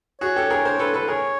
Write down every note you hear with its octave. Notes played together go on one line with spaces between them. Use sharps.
F#4 G#4 C#5
G4 A4
G#4 A#4
A#4 C5
A4 B4
A4 B4
G#4 A#4 C#5